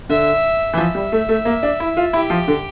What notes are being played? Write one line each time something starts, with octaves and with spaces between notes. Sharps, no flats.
D3 E5
E3
F3 E5
G3
A3
A3
A#3
D4
E4
F4
E4 G4
F3
D3